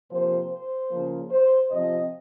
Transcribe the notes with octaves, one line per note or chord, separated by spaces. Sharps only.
C3 F3 A#3 C5
C5
C#3 F3 A#3
C5
C3 F3 C4 D#5